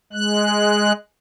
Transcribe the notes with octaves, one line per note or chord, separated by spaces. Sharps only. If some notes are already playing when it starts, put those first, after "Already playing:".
G#3 F#6